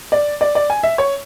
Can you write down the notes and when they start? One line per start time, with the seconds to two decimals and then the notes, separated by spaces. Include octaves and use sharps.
0.12 D5
0.41 D5
0.55 D5
0.70 G#5
0.83 E5
0.98 C#5